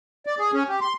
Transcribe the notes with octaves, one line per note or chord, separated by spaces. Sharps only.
D5
G#4
C#4
G4
C6